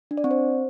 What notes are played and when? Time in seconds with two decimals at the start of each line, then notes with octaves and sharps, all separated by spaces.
0.11 D4
0.17 D5
0.24 C4
0.31 C5